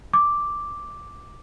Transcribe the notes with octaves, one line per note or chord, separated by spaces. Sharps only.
D6